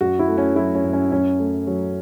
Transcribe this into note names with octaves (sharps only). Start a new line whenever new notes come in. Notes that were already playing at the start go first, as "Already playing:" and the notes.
F#2 F#4
E4
A3
C#4
F#3 E4
C#4
F#2
C#4
F#2 C#4
A3
F#3